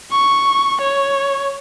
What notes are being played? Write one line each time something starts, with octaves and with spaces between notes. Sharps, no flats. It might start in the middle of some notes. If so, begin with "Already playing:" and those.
C#6
C#5